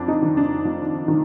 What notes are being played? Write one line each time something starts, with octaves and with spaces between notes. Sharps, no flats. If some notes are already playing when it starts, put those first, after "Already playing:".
Already playing: F2 D4
D#4
D#3
D4
F2
D#3